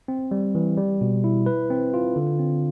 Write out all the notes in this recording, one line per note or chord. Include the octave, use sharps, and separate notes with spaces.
C4
G3
E3
G3
B2
E4
B4
C4
F4
D3
C4